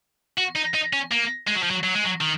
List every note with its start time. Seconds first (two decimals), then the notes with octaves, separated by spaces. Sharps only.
0.38 F#4
0.56 D#4
0.74 D#4
0.93 C#4
1.12 A#3
1.47 G#3
1.55 F#3
1.63 F3
1.70 F#3
1.83 F#3
1.95 G#3
2.05 F#3
2.21 D#3